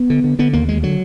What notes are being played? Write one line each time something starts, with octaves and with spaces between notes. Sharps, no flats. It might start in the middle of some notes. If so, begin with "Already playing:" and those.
Already playing: B3
D3
D3
D3 B3
D#2 A#3
D2 G#3
D3 F#3